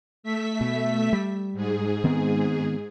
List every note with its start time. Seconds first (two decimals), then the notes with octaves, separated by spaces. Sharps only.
0.23 A3 E5 B6
0.61 B2
1.13 G3
1.54 G#2 G#4
2.04 D#3 B3 C4